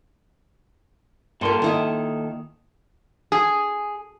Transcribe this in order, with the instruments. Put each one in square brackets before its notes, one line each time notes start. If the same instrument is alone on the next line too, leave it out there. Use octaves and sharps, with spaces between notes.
[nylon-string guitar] G2 A#4 [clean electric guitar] A#2 A4 C6
[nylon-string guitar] D#3 E4 D#5
[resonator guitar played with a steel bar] G#4